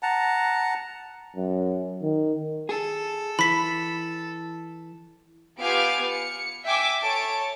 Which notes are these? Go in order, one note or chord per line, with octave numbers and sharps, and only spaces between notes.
F#5 A5 A#5
F#2
D#3
G#4 A4
E3 B5 B6
B3 F4 G4 F5 G#5 D7
C#7
E5 G5 G#5 D6 E6
A4 C#5 A5 D7